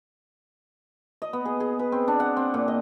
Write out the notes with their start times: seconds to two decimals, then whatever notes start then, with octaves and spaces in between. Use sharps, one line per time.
1.22 D#5
1.33 B3
1.45 G#4
1.60 G#4
1.79 B4
1.92 C4
2.08 D4
2.20 F#5
2.37 C4
2.54 A#2
2.68 D#5